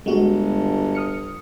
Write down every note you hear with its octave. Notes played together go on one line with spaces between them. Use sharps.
G1 G#3 F#4
D#6 F6 C#7